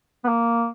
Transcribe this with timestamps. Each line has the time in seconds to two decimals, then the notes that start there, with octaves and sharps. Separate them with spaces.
0.24 B3
0.28 A#3